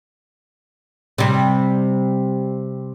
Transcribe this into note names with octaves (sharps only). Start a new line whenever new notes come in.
C3 G3